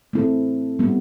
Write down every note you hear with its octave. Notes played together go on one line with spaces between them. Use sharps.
A3 C4 E4 A4
G3 B3 E4